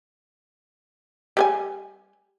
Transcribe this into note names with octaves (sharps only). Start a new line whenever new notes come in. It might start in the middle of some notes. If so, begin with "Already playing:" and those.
G3 C5 G#5